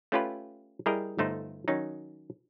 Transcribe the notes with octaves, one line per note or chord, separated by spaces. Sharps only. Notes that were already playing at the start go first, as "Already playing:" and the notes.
A3 C#4 F4 G4 B4
G3 E4 G#4 A#4 D#5
G1 A3 D#4 C5
D#3 F#3 C#4 D#4